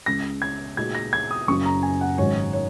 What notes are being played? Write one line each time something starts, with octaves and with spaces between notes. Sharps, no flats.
C#2 C#3 G#3 A#6
G#6
A#2 G#3 D#4 F#4 G#6
A#6
G#6
D#6
F#1 F#2 C#3 F#3 C#6
A#5
G#5
F#5
G#1 G#2 F#3 C#4 C#5
C#5